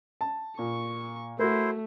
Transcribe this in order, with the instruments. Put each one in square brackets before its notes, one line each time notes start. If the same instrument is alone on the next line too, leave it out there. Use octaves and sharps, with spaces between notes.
[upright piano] A5
[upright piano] A#2 [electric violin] C#6
[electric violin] A3 [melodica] E4 C5 [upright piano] F#4 A#4